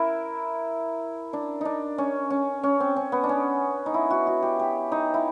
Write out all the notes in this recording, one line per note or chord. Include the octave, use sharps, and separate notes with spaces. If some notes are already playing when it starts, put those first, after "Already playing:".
Already playing: E4 A#4
D4
D4 D#4
C#4
C#4
C#4
C4
C#4
B3
D4
C#4
D#4
E4
F#4
F#4
G4
G4
D#4
E4